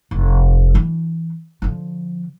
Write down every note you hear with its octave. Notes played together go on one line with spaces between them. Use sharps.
F1
E3 D4
D3 F3